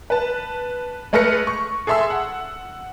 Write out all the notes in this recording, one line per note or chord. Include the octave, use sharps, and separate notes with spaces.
B4 A5
G#3 A3 B4 F6 A#6 C#7
C#6
G#4 A4 E5 C6 E6
F#5